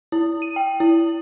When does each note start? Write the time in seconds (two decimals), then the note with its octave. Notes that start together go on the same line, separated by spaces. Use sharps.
0.12 E4
0.42 D#7
0.56 G5
0.80 E4